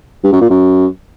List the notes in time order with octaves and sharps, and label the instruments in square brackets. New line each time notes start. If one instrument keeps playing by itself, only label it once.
[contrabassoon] G2
F#2
A#2
F#2